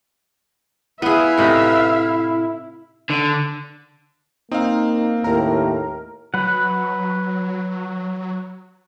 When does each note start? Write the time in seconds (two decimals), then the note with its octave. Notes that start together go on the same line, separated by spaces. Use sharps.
1.02 B3 E4 G#4 B4 E5 F5
1.38 A2 C3 D#4
3.10 D3
4.51 A#3 C4 D#4 F5
5.24 D#2 A2 G4 A#4
6.34 F#3 B4 F#5